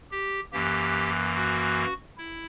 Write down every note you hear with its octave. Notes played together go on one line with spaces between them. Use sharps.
G4
F#2 E3 A#3 G4
F#4
E4